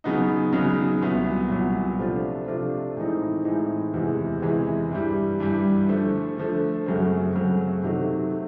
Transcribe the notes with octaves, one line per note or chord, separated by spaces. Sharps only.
C#3 F#3 B3 D#4
C#3 F#3 B3 D#4
C2 A#2 F#3 B3 E4
C2 A#2 F#3 B3 E4
C3 F3 A3 D4 F4
C3 F3 A3 D4 F4
A2 E3 G#3 C4 D#4
A2 E3 G#3 C4 D#4
E2 C3 E3 G#3
E2 C3 E3 G#3
G2 E3 G3
G2 E3 G3
D3 F3 A3
D3 F3 A3
F#2 C#3 F#3 A3 C4
F#2 C#3 F#3 A3 C4
C3 D#3 F#3 A3
A3